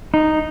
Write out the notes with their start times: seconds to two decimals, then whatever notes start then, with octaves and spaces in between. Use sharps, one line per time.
0.14 D#4